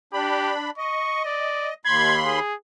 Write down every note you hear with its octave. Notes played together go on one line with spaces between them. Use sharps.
D4 G4 B5
D#5 C#6
D5
D#2 B5 C6 G#6
G#4